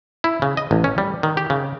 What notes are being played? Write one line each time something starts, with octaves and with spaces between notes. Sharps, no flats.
E4
C#3
D#5
A1
C#4
G3
D#3
G4
C#3